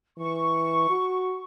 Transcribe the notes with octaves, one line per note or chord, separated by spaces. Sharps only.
E3 C#6
F#4